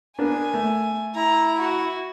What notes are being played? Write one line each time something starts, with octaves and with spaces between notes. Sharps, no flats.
A#3 B3 D4 G#5
A3
E4 A#5
F#4